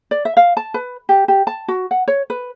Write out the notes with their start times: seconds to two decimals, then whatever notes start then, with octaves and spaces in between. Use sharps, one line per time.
0.11 D5
0.25 E5
0.37 F5
0.57 A5
0.74 B4
1.09 G4
1.28 G4
1.47 A5
1.68 F#4
1.91 F#5
2.08 C#5
2.30 B4